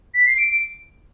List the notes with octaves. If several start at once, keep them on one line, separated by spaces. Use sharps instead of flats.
B6
C7
D7
D7